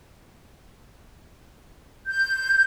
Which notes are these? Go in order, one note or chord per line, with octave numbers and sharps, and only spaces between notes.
G6